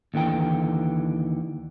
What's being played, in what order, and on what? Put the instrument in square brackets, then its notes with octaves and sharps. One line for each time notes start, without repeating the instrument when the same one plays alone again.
[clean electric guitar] D#2 D3 E3 G5